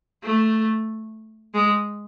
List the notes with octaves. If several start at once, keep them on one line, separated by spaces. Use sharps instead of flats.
A3
G#3